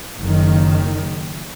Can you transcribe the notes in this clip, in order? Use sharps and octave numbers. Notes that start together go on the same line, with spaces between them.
F#1 D#3